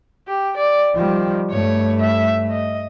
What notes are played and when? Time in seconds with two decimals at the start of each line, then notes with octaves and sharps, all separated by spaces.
0.28 G4
0.57 D5
0.95 D#3 F3 G3
1.51 G2 A3 C#5
2.00 E5
2.50 D#5